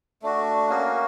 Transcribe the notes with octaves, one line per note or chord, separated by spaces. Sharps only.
A3 D4 F#4
A#3 C#4 F#4 G#4
A#4